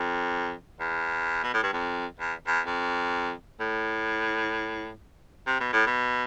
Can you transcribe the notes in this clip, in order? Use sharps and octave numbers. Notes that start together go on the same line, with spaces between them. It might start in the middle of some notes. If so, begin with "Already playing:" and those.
Already playing: F2
E2
B2
A2
G2
F2
E2
E2
F2
A2
C3
B2
A2
B2